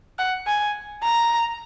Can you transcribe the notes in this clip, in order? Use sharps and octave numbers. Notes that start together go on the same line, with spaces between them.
F#5
G#5
A#5